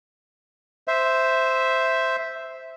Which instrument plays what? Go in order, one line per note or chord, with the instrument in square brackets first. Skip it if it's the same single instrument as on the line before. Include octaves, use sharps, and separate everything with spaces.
[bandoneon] C5 E5